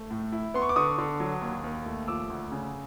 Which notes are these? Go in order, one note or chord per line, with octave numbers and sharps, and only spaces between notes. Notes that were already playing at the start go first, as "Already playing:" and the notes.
Already playing: A3
A2
E4
B3 C6
C#6
D6
D3 C#6 D#6
D3
F#3
D#2
D#2
A3
F3 D6 E6
D2
C#3